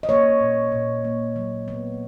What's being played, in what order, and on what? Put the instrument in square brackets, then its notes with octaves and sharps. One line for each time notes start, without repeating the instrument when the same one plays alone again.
[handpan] D#5
A#3 C#5
A#2
A#2
A#3
F#3
B3